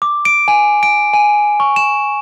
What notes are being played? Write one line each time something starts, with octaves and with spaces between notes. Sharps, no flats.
D6
D7
G#5
D7
G#5
C#6
E7